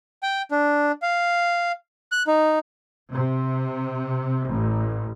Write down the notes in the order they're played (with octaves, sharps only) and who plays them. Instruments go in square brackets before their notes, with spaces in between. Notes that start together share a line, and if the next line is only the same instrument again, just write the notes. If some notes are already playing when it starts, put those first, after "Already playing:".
[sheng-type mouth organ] G5
D4
F5
F#6
D#4
[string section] C3
A1